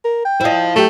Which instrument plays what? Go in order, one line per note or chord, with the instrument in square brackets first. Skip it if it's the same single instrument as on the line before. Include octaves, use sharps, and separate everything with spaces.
[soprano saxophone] A#4
G5
[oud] E4 D#5 [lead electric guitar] C5 F5
[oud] F#3 G4 [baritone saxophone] A3